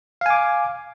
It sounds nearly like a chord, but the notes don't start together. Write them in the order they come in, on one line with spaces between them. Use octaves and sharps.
F5 G#5 D6